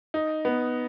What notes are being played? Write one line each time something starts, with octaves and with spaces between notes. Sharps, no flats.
D#4
B3